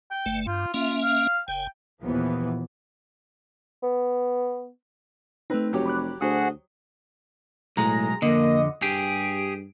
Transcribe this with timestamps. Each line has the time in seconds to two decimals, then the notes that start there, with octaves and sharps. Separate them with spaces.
0.11 G5
0.26 G1 A3
0.47 G2 F4
0.74 A#3 C#4 F4 E5
1.02 F5
1.48 F#1 G5 G#5
2.01 D#2 A#2 E3 F3 B3
3.83 B3
5.50 A3 C4 D#4 B4
5.73 F1 F#3 G4 C#5
5.86 B5 D6 F#6
6.21 D2 F#4 G#4 C5 F#5 D#6
7.77 B1 A2 G#3 A#5
8.22 F2 D3 A#3 D#5
8.82 G2 G4 G#4 D7